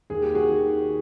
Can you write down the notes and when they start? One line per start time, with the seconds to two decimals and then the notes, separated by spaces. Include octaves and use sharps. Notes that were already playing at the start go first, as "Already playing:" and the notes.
0.10 D#2 G#4
0.22 G4
0.34 F#4 G#4
0.49 D#3